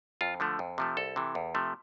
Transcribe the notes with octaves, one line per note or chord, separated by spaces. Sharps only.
F2 F4
D3 F3 A3
F2
C3 F3 A3
C2 A4
C3 E3
E2
C3 F3 A3